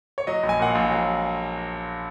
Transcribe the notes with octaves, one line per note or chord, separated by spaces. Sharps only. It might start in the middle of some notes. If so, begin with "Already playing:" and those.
C#5
F#3 D#5
A#1
G#5
A#2 F#5
F5
A#1
F#3 F5